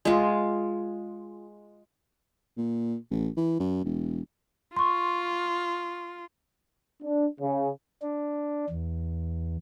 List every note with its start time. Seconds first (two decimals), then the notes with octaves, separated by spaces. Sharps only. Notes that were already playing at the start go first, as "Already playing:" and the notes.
0.05 G#3 F4
2.57 A#2
3.11 A1
3.37 E3
3.60 F#2
3.84 E1
4.76 F4 C6 C#6
7.03 D4
7.40 C#3
8.02 D4
8.70 E2